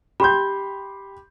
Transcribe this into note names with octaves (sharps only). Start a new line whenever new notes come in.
G4 B5 C6 G6